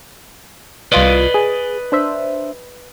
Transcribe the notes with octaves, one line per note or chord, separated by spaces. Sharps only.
C2 F4 B4 D5 D#5 D7
G#4
D4 C5 E5